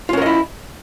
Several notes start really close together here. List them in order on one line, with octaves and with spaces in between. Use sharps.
F4 C#4 A#4 D#5 E4